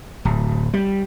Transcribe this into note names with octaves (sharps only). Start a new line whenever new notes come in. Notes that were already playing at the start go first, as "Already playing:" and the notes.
D1
G3